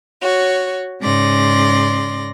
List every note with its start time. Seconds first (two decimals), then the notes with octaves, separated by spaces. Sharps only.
0.21 F#4 C#5
1.01 G#2 C#3 D5 C6 A#6